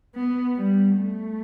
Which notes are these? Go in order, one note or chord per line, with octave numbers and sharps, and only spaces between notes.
B3
G3
A3